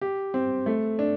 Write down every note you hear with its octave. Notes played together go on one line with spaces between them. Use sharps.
G4
C4
A3
D4